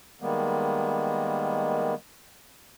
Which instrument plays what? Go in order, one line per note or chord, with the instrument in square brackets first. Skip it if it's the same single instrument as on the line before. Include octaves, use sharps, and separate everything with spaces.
[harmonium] D#3 G3 G#3 A#3 B3